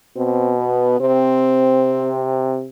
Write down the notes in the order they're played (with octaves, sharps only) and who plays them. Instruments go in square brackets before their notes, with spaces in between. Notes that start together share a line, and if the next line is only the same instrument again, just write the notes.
[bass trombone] B2 [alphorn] C4
[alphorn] B3
[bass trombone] C3 [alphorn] C4